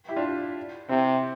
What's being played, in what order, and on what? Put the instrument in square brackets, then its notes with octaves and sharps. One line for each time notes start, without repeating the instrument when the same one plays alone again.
[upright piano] E4 G4
D4 F4
[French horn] C3 [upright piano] C4 E4